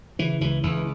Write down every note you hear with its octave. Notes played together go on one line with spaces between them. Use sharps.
C#3 E3
C#2 E3
C#2 E3